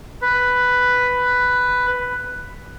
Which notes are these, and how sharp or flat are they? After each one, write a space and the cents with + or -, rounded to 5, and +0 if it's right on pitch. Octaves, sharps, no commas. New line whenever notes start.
B4 +5